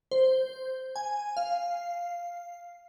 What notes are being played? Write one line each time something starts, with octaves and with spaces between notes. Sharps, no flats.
C5
G#5
F5